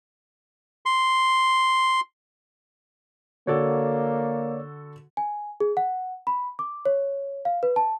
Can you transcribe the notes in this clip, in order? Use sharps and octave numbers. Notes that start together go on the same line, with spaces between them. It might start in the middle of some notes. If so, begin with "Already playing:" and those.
C6
D3 A#3 F#4 A4 C#5 D5 D6
G#5
G#4
F#5
B5
D6
C#5
F5
B4
A5